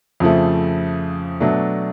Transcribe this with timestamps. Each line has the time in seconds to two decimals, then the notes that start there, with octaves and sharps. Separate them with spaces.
0.20 F2 C#3 F3 A3
1.40 B2 F#3 A3 D4